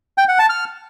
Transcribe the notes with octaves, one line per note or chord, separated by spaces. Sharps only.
G5
F#5
A5
F6